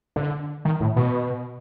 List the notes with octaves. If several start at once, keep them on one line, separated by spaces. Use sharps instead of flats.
D3
D#3
A2
B2